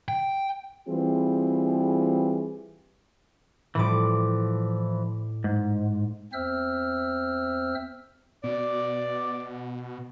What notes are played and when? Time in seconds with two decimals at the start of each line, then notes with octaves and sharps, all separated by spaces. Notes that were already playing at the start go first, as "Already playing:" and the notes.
0.08 G5
0.89 E3 G3 C4 F4 G#4
3.75 A2 E3 F3 G3 D6
5.44 G#2
6.33 E2 C4 C5 E5 E6 F6
8.44 B2 D5